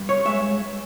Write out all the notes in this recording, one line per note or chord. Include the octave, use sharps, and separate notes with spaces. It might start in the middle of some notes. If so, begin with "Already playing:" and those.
Already playing: G2
C#5
G#3 E5